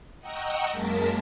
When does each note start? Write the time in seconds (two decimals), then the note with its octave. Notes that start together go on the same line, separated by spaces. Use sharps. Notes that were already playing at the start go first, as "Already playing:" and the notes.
0.20 D#5 F#5 G5 A#5 C#6 E6
0.70 F#2 G#3 A#3 A#4 A5 B6